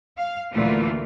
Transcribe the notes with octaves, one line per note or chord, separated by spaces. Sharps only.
F5
D2 A#2 E3 A3 F4